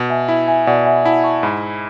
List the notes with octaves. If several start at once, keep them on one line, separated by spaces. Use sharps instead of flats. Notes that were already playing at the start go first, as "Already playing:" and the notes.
Already playing: B2
E5 G#5
E4 E5
E5 G#5
B2 D5 F#5
E5 G#5
E4 F#5 A5
A5 C#6
G#2 G#5 B5